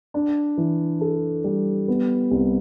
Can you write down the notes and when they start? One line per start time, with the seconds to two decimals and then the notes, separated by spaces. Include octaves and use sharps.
0.14 D4
0.57 E3
1.01 A4
1.44 G3
1.88 B3
2.31 C2